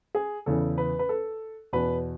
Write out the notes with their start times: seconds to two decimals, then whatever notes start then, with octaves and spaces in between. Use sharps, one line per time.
0.15 G#4
0.46 E2 C#3 E3 A4
0.78 B4
0.99 B4
1.09 A4
1.73 E2 B2 B4